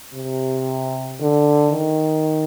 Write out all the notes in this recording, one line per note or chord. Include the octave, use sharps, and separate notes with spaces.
C3
D3
D#3